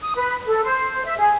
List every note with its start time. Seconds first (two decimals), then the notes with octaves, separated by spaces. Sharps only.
0.02 D#6
0.15 B4
0.47 A4
0.64 C5
1.05 E5
1.18 G#4